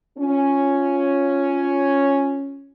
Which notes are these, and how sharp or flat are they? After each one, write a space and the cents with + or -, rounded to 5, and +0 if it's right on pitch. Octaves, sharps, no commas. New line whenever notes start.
C#4 +0 F4 +0